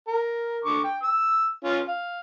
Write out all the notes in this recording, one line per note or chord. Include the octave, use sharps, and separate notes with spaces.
A#4
D3 C#6 D6
G5
E6
C#4 F4
F5